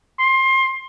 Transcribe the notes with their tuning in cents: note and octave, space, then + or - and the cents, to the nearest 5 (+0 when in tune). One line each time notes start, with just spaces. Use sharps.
C6 +25